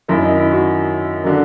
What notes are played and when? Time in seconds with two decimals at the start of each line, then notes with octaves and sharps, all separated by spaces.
0.08 F#2 D#3 F#3 A#3 E4
0.23 D#4
0.37 E4
0.52 F#4
1.24 D3 F#3 A#3